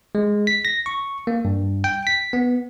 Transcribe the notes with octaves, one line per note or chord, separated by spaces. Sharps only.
G#3
B6
A#6
C#6
A#3
G2
G5
B6
B3